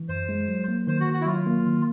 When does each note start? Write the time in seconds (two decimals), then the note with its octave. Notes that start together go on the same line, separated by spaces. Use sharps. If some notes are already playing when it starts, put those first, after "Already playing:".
Already playing: E3
0.09 F#2 C5
0.29 G#3
0.48 F#3
0.68 A#3
0.87 D#3 C5
1.00 F#4
1.07 D#3
1.14 F#4
1.21 E4
1.26 F#3 F4
1.47 A#3
1.65 D#3